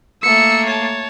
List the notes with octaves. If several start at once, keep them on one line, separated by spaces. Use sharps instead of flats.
A3 A#3 E6 C#7
C#5 A5